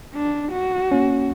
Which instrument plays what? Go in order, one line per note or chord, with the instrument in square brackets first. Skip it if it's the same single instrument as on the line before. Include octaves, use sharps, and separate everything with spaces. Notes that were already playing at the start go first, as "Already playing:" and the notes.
[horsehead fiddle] D4
F#4
[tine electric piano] A#3 C#4